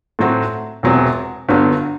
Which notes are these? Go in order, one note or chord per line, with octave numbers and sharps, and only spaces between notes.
A2 F#3 C4 F#4
E1 E2 C3 F#3 C4
G1 G2 F#3 B3